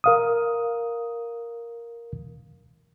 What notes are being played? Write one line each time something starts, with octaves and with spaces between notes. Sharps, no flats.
A#4 F5 D#6